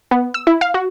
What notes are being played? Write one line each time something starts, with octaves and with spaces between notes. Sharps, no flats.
B3
E6
E4
F5
F#4